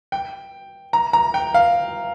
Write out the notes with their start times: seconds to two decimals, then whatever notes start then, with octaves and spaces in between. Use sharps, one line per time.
0.12 G5
0.93 A#5
1.13 A#5
1.34 G5
1.54 F5